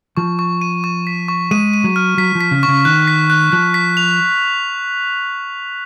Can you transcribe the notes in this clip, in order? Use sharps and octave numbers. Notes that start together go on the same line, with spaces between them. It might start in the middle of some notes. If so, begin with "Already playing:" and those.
F3 C#6
C#6
D#7
C#6
B6
C#6
G#3 D#7
D#7
F#3
F6
F#3 B6
F3
B6
C#3
C#6
C#3
D#3 F#6
B6
F#6
F3 F#6
B6
F7